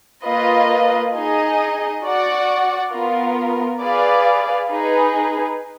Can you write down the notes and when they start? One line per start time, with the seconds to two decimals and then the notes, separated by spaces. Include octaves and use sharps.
0.25 A#3 F4 B4 D#5
1.14 D#4 G#4 D#5
2.03 F#4 D5 F#5
2.92 B3 F4 A#4
3.80 G#4 B4 D5 F5
4.70 D#4 G#4 B4